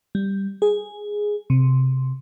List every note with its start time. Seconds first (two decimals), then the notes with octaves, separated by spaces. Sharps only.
0.15 G3
0.62 G#4
1.50 C3